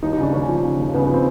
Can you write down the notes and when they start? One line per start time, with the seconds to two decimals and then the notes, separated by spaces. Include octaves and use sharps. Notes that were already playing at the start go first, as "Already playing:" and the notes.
0.03 D#2 D#4
0.13 D#4
0.18 C#3 D4
0.33 D#2 C#4
0.48 F3
0.64 C#3
0.79 D#2
0.94 C#3 B3
1.05 B3
1.09 F3
1.14 C4